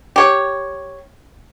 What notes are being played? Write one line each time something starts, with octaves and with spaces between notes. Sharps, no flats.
G4 C#5